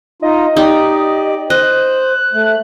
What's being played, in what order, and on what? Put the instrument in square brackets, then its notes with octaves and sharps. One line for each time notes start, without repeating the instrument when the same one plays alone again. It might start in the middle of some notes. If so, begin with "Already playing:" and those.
[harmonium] D#4 F4 [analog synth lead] D#5
[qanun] D#4 [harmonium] G4 D5
[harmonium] C5 [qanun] D#5 [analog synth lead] F#6
[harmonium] A3